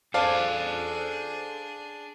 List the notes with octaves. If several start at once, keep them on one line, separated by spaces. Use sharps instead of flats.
D4 G#4 A4 C5 D5 F5 A5